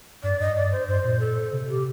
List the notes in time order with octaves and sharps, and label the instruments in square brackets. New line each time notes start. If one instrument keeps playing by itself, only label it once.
[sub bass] G2 [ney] D5
[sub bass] G2 [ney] D#5
[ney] D5
C5
[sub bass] G2 [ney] C5
[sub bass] A#2
[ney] A4
[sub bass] C3
[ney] G4